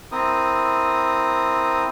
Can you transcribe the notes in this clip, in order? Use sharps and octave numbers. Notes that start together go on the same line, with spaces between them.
C4 E4 A#4 D#6